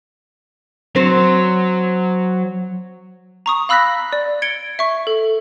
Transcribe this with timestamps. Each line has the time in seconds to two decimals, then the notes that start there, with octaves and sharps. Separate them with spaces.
0.96 F#3 C4 C5
3.46 A#5 C#6 D#6
3.69 F5 B5 E6 F#6 A#6 B6
4.13 D5
4.42 G#6 C#7 D7 G7
4.79 E5 C#6
5.07 A4